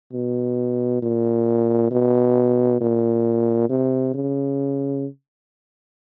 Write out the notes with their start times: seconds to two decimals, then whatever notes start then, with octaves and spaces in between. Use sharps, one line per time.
0.13 B2
1.03 A#2
1.91 B2
2.81 A#2
3.70 C3
4.14 C#3